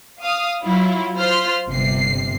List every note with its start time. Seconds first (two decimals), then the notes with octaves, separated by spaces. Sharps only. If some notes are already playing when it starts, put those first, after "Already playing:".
0.23 F5 D#6
0.62 F#3 E4 F4
1.17 F4 C5 C6 F6 B6
1.69 G1 C3 C7